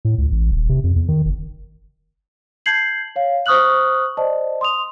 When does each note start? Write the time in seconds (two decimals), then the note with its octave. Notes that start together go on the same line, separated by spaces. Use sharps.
0.05 A2
0.18 C#2
0.31 A1
0.51 D#1
0.69 C3
0.84 F2
0.96 E2
1.08 D#3
1.25 F#1
2.66 A5 G6 G#6 C7 F#7
3.16 C#5 F5
3.46 C5 C#6 D#6 F6 F#6 F#7
4.17 C5 D5 D#5 A5
4.61 C6 D#6 F7